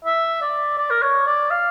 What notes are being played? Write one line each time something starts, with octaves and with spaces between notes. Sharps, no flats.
E5
D5
D5
A#4
C#5
D5
F5